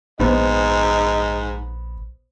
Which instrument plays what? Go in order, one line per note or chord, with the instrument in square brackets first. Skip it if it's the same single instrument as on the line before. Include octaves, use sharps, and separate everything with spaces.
[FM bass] A#1 [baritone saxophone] G#2 [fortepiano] B3 C5 [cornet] D#5